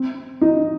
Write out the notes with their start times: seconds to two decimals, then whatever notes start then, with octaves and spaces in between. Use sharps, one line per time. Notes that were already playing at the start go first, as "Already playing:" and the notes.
Already playing: C4
0.41 D#4